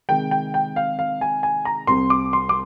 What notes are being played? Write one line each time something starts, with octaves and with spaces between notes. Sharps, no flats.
C3 D#3 G#3 G5
G5
G5
F5
F5
G#5
G#5
A#5
C2 C3 G3 C4 C6
D6
C6
D6